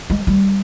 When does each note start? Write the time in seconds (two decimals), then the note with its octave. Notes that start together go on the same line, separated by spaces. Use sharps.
0.10 G#3
0.27 G3